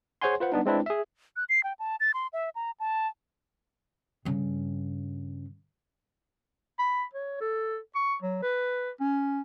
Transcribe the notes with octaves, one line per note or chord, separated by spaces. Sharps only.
G#4 C5 C#5 F#5 G#5 C6
F4 B4 C5 F#5
G3 B3 D4 D#4
G#3 C4 D4 E4 B4
G#4 E5
F#6
C7
G5
A5
A6
C6
E5
A#5
A5
G2 C#3
B5
C#5
A4
C#6
F#3
B4
C#4